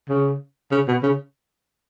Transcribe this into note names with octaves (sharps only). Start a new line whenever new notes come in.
C#3
C#3
B2
C#3